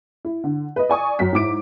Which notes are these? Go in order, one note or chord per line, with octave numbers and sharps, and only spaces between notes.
E4
D3
B4 D#5
D5 G#5 C#6 D#6
F#2 B6
G#2 E4 D6 D7